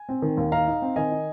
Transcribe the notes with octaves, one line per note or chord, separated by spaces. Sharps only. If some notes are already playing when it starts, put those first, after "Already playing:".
Already playing: G#5
C4
D#3
D#2
D#4 F5 A#5
D#4
C4
D#3 D#5 G#5
D#4